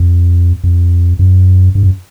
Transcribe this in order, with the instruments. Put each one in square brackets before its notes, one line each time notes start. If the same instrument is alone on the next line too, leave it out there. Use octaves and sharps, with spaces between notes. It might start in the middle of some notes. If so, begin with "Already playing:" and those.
Already playing: [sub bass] F2
F2
F#2
G2
F#2